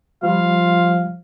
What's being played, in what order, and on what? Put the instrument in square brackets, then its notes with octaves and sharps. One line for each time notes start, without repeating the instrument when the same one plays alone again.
[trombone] F3 [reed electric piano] G3 [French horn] F4 [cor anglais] F5